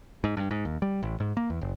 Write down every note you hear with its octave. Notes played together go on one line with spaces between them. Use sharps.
G#2
G2
G#2
D#2
G3
A1
G#2
A#3
E2
F#1